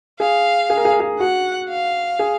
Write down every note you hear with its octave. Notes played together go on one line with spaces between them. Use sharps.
G#4 F5
G#4
A#4
G#4
A#4
G#4
F#4 F#5
F5
G#4